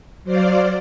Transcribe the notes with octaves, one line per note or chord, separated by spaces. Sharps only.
F#3 C5 D5 F5